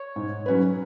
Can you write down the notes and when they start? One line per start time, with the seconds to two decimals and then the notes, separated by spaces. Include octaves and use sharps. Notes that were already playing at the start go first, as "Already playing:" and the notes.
Already playing: C#5
0.16 G#2
0.46 F#3 C#4 F#4 B4